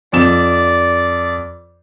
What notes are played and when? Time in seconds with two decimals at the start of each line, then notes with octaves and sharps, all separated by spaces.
0.13 F2 D5 E7